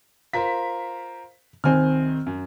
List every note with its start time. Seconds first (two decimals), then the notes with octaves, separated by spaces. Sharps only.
0.33 F4 A#4 C5 B6
1.64 C2 D#3 C4 G#5 F6
2.26 F#2